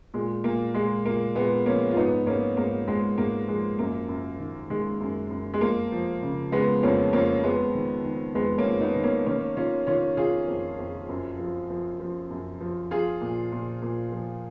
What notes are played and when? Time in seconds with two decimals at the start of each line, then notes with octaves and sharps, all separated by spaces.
0.14 A#2 G#3
0.44 A#2 A#3
0.75 A#2 G#3
1.05 A#2 A#3
1.35 A#2 G#3 B3
1.65 F3 A#3 C#4
1.91 F4
1.97 G#2 B3 D#4
2.26 G#2 A#3 C#4
2.57 G#2 A#3
2.88 G#2 G#3
3.18 G#2 A#3
3.48 F3 G#3
3.79 F#2 A#3
4.09 F#2
4.39 D#3
4.70 D#3 G#3
5.00 F#2
5.31 F#2
5.54 G#3
5.61 F2 A#3
5.92 F3
6.23 C#3
6.52 C#3 G#3 B3
6.83 F2 A#3 C#4
7.13 F2 A#3 C#4
7.44 F2 G#3 B3
7.75 D#3
8.04 D#3
8.35 F2 G#3 B3
8.58 A#3 C#4
8.65 F2
8.80 B3 D#4
8.96 D#3
9.03 A#3 C#4
9.26 D#3 A#3 C#4
9.57 D#3 C#4 F4
9.87 D#3 C#4 F4
10.17 D#3 F4 G#4
10.48 F2
10.79 F2
11.09 F#2
11.39 F3
11.70 F3
12.00 F3
12.31 F#2
12.61 F3
12.91 F3 F4 G#4
13.21 A#2
13.52 A#2
13.82 A#2
14.12 F3